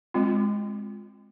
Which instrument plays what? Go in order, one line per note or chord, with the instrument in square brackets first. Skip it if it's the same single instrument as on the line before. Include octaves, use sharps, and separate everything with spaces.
[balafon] G#3 C4 F4